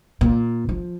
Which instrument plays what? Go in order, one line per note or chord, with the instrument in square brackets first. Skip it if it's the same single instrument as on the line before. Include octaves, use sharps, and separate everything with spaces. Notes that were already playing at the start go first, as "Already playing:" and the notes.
[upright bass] A#2
F3